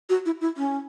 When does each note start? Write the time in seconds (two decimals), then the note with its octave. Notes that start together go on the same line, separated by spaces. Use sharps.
0.09 F#4
0.26 E4
0.41 E4
0.57 C#4